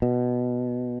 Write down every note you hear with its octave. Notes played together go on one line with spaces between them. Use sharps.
B2